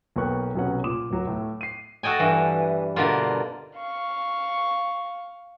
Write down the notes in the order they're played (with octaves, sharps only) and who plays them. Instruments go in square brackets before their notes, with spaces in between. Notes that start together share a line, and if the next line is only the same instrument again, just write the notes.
[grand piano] B1 A#3 B3 G5 C#6 F#6
B1 C3 F#3 B3 C#4 F#5
A#2 D6 D#6 E7
D1 F#3 A#5
A2 A3
C7 D#7
[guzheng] F#4 A4 D#5 G5 G#5
G2 E3
B2 D3 A#3 F4
[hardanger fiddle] F5 C#6